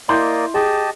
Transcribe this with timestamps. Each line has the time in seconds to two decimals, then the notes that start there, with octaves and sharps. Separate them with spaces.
0.09 A#3 E4 D5 D#5 C6 G6
0.54 G4 G#4 D#5 A5